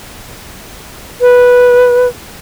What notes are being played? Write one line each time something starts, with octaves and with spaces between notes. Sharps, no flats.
B4